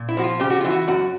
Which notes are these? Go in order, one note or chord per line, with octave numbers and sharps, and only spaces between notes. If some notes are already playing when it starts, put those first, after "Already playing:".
Already playing: A#2
E4
F3 F#4
F4
C#3 G4
F#4
E3 F4
F#4
F#2 F#4